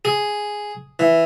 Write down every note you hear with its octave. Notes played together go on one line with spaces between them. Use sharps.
G#4
E3